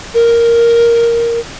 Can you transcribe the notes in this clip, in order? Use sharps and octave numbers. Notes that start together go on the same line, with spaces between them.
A#4